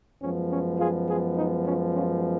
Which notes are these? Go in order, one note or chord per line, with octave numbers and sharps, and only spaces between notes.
F#2 F3 G#3 B3 C#4
C#4
F4 G#4
F4 G#4
D#4
C#4 F4
C#4 F4